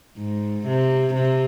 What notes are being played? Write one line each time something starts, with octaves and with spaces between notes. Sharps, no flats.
G#2
C3
C3